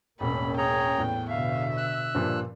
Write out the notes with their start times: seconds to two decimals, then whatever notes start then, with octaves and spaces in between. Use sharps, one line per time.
0.20 E1 A1 A#3 C#4 B5
0.58 G#4 C#5 G5 A#5
0.98 E2 A2
1.30 B2 D3 E5 F5
1.77 E6 F#6
2.15 G2 A#2 F3